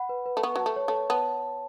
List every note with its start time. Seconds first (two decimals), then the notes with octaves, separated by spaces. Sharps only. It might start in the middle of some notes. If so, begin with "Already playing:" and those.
Already playing: F#5 B5
0.09 B4
0.26 B4
0.37 A3
0.43 B3 C#6
0.56 F#3 A5
0.66 A3
0.76 C#5
0.88 A3
0.94 C#5
1.10 B3 A5